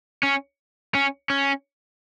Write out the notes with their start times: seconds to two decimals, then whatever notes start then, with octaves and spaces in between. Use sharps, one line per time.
0.23 C#4
0.95 C#4
1.30 C#4